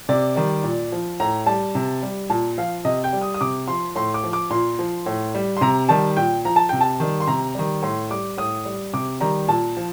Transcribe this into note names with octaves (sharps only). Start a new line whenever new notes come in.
C3 D5
D#3 G3
A#2
F3
A2 A#5
G3 A5
C3
G3
A#2 A5
F3 F5
C3 D#5
G5
G3
D#6
D#6
C3 D6
F3 C6
A2 C6
D6
F3
D6
A#2 C6
F3
A2
G3
C6
C3 A#5
D#3 G3 A5
A#2 G5
F3 A#5
A5
C3 G5
A5
D#3 G3
C6
C3 A#5
D#3 G3
A2 C6
G3 D6
A2 D#6
G3
C3 D6
D#3 G3 A#5
A#2 A5
F3